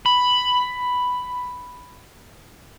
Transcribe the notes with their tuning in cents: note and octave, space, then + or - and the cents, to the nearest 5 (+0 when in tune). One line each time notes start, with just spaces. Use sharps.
B5 +5